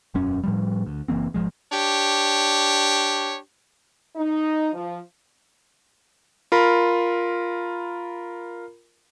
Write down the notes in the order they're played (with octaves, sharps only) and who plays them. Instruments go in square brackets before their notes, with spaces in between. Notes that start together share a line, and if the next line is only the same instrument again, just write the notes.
[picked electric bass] E1 F#2 C#4
A2 F3 G3
D2
F#1 E3 A#3 C4
G#1 E2 F3 G#3
[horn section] D4 G4 C#5
[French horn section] D#4
F3
[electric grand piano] F4 A#4 B5